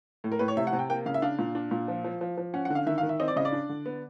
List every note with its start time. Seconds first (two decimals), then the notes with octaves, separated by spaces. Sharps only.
0.24 A2
0.32 A#4
0.39 A2 B4
0.48 C#5
0.57 C3 E5
0.67 F#5
0.73 C3
0.79 G5
0.90 A#3 G5
1.06 C#3 F5
1.14 E5
1.22 D4 F5
1.39 A#2
1.55 D4
1.71 A#2
1.88 F3
2.04 F3
2.21 F3
2.37 F3
2.54 C#4 F#5
2.65 F#5
2.70 D3
2.75 F5
2.86 D#3 E5
2.98 F5
3.03 D#3
3.09 E5
3.20 C4 D#5
3.28 D5
3.36 C#3 D#5
3.45 D5
3.52 D4
3.69 D3
3.86 B3